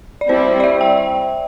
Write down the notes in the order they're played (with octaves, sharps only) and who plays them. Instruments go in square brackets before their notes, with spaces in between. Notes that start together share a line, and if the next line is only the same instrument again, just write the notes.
[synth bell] D5
[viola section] G3 C4 E4 [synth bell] C5
[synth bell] D5
E5
G5